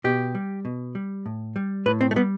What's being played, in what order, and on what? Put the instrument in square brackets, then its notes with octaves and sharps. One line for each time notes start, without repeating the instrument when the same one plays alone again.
[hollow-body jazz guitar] B2 G4
G3
B2
G3
A2
G3
A2 B4
C4
A3
G3 B3